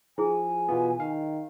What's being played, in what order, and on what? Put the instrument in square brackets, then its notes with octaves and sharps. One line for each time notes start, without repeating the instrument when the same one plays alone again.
[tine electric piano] F3 [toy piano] E4 G#4 [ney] G#5
[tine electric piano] B2 E3 B3 [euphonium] F4
[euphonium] D#3 [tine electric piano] F5